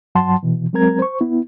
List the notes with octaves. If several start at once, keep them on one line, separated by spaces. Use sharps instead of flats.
G2 F#3 F#5 A5 C6
B2 E3
F#3 G#3 C4 A#4 A#5 G#6
C5 C#6
B3 E4